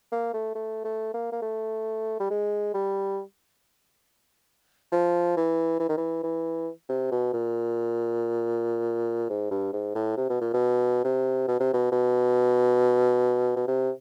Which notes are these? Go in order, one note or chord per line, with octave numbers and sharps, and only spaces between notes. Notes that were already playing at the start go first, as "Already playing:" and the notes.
A#3
A3
A3
A3
A#3
A#3
A3
G3
G#3
G3
F3
E3
E3
D#3
E3
E3
C3
B2
A#2
G#2
G2
G#2
A2
C3
B2
A#2
B2
C3
B2
C3
B2
B2
B2
C3